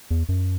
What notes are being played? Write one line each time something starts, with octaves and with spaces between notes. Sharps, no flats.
E2
F#2